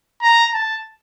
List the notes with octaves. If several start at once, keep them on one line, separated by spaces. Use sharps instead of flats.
A#5
A5